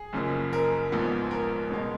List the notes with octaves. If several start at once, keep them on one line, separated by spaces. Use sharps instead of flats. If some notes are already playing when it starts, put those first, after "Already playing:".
Already playing: G#4
F#1 F#2 C#3 F3 A#3
A#4
A#1 G#2 F3 B3
A#4
C#2 B2 G#3